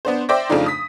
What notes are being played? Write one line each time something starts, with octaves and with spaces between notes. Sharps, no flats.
B3 D4 C5
C5 D5 E5 G5 D6 A#6
F2 C#3 F3 A3 D4 D#4
D#6 B6